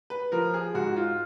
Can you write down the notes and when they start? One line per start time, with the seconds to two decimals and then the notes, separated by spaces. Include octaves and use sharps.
0.10 B4
0.32 F3 A#4
0.54 G#4
0.74 G#2 F#4
0.96 F4